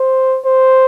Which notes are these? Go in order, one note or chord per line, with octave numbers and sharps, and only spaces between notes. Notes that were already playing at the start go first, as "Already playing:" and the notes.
Already playing: C5
C5